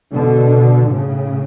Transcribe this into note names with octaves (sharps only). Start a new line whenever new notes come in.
B2 D3
A2 C#3